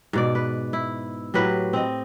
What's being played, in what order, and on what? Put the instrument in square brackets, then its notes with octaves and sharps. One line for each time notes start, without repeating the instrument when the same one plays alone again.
[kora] G#2 B2 D5
B4
E4
A2 F#3 G4 B4
C4 D#5